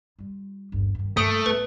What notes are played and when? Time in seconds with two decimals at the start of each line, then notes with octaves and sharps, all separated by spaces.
0.19 G3 F4
0.72 G1 D#2
0.95 G2 D#3
1.17 G2 D#3 A3 D#6 D7
1.46 A1 B3 B4